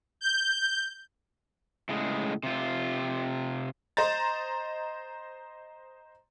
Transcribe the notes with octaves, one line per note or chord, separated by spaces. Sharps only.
G6
A2 C#3 G#3
C3 F4
C5 D#5 A#5 A6